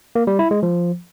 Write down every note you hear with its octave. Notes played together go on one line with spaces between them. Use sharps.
A#3
G3
E4
G#3
F3